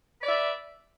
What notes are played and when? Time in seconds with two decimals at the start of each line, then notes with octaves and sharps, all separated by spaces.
0.20 B4
0.23 D5
0.27 E5